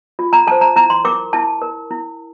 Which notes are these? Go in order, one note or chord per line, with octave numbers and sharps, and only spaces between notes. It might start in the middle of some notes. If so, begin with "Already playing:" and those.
F4
A#5
A4 C5 A5
A#5
E4 A#5
C6
A#4 D6
E4 A5
A#4
E4